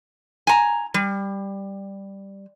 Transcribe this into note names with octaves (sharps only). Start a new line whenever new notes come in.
G#5 A#5
G3